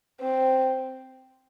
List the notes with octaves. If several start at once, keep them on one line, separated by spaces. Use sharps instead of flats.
C4